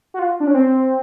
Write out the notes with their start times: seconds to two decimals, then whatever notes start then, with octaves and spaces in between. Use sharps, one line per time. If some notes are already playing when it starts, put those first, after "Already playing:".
0.14 F#4
0.19 F4
0.40 D4
0.47 C#4
0.54 C4